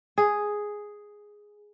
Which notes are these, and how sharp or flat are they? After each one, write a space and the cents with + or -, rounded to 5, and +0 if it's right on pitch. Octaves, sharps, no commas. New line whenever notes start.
G#4 +0